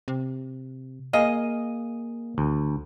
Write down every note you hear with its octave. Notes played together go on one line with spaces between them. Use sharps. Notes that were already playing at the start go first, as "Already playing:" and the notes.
C3
A#3 G#4 D#5 F5
D2